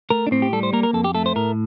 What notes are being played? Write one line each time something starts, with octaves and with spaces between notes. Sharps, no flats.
A3 A#4
D4
A2 C4
G4
G3 A4
C5
A#3 A#4
A#4
F2 A4
G4
A3 A4
C5
A2 A#4